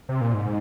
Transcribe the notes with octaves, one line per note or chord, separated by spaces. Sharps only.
C3
A#2
G#2